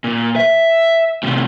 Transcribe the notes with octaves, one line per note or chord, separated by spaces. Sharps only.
A#2
E5
A2 C3